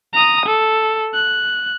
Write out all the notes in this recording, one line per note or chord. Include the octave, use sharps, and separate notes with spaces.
A#5 D#6
A4
F#6